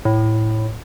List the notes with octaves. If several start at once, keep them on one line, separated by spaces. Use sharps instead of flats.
A2